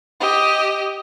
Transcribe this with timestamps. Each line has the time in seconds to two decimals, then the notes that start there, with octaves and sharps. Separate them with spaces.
0.20 G4 D#5